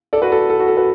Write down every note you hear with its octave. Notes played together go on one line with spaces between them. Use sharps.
A4 D5
F#4 B4
A4
A4
F#4
A4
F#4 B4